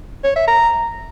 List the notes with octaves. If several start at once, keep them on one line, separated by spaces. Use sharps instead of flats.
C#5
E5
A#5